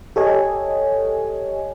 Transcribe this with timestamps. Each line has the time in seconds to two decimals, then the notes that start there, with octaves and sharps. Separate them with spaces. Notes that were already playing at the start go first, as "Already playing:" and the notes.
0.16 G4 A4 C#5 D#5 G#5